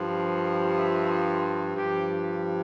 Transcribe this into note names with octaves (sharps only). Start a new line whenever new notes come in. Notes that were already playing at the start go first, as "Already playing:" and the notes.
Already playing: G2 F3
E5
G2 G4
F3